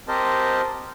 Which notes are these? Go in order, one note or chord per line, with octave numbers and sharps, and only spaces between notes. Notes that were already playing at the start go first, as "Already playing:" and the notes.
C4 G4 A#4 C5 D#5 A5